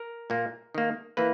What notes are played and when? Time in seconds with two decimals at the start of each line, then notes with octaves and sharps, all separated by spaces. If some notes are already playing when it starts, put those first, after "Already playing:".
Already playing: A#4
0.30 A#2 A#3
0.75 D#3 A#3
1.17 E3 A#3 B4